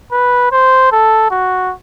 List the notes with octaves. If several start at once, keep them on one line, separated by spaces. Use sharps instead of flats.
B4
C5
A4
F#4